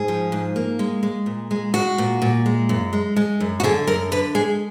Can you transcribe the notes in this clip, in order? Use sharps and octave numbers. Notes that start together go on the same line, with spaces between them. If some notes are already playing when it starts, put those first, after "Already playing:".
Already playing: G#2 G#4
F3
G#2
A#3
G#3
G#3
A#2
G#3
G#3 F#4
A#2
A#2
G#3
F#2
G#3
G#3
F#2
F#4
D3 G#4
F#2 A#4
D3 B4
G#3 G#4